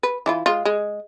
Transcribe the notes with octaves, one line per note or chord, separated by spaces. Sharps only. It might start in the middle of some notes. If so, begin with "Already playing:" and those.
B4
E3 E4 F4
G#3 F4
G#3